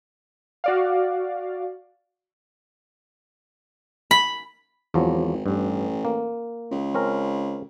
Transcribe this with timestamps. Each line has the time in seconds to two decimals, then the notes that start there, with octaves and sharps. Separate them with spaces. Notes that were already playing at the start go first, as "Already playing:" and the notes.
0.64 F#4 D5 F5
4.11 B5
4.94 G#1 E2 F3 F#3
5.46 A1 G2
6.05 A#3
6.71 C#2
6.94 C4 C#4 A#4